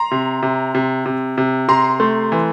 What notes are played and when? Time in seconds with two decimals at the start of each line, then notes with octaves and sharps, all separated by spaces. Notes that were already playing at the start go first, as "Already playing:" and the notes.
Already playing: A#5 C6
0.11 C3
0.43 C3
0.75 C3
1.06 C3
1.38 C3
1.68 C3 A#5 C6
2.00 A3
2.32 E3